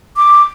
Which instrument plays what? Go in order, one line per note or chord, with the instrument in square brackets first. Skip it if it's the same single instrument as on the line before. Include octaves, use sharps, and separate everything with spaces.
[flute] D6